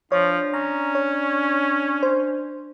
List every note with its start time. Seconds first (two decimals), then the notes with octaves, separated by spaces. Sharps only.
0.12 F3 D4 C#5
0.53 C#4 A#5
0.95 C#5
2.03 C5